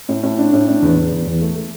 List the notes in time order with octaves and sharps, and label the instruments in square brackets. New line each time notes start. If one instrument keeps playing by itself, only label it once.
[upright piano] A2
A2
D4
A2
D4
E2
E2
E2
E2
A3
A3